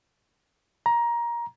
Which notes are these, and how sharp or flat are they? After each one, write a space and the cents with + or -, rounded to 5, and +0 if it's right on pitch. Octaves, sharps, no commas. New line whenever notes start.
A#5 +20